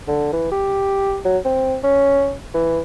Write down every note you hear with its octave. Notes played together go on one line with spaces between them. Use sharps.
D3
E3
G4
F#3
C4
C#4
E3